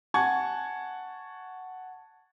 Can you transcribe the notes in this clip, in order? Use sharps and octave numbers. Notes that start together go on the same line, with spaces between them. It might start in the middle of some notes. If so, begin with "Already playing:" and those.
F#5 G#5 A5 C#6 G#6